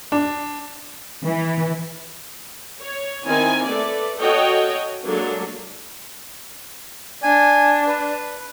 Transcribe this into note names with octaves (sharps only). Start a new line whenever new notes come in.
D4
E3
C#5
D#3 C4 E4 G#5
A3 A4 B4 D5
F#4 A4 C#5 D#5 G5
F#3 G#3 A#3 D4 A4
D4 G#5
B4